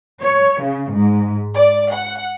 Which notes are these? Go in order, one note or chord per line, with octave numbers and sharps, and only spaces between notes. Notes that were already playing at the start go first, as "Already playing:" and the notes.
C#5
C#3
G#2
D5
F#5